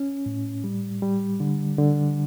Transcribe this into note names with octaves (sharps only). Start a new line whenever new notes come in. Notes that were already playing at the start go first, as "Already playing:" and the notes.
Already playing: C#4
A2
G3
G3
D3
D3